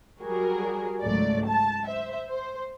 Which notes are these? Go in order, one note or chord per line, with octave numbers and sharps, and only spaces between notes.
F#3 G3 F#4 G#4 A#4
G#1 C#2 F#3 A3 D5
A5
C5 E5
C5